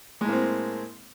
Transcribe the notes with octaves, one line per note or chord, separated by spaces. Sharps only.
A2 G#3 A#3 C4